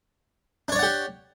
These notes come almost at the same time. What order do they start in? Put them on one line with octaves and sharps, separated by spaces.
D4 C#5 D5 F#5 G4